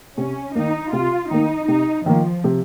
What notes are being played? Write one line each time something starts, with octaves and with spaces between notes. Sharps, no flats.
C3 C#4
D#3 A#3 D#4
C3 F4
D#3 A#3 D#4
C3 D#4
D#3 F3 A#3
C3